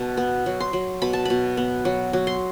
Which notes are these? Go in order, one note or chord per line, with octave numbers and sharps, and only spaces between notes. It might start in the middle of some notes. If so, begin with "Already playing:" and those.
Already playing: B2 A5
B3
F#3
C6
F#3
B2 B5
A5
B2 B5
B3
F#3
F#3
C6